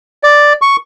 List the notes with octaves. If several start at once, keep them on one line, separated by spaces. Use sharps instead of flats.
D5
C#6